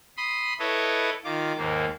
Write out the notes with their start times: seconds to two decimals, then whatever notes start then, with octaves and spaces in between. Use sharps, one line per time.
0.17 B5 C6 D#6
0.60 E4 A4 B4 C#5 D#5
1.24 D#3 F4 D6
1.57 D#2 G#2 A#3